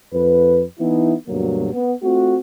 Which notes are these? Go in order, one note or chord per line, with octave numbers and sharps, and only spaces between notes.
F2 B4
E3 B3 D#4 E4
D2 G2 B2 F#3 A#3
B3
A3 C4 F4 F#4